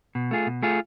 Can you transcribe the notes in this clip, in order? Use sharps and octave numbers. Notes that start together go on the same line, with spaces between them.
B2
A3 F4 G#4
B2
A3 F4 G#4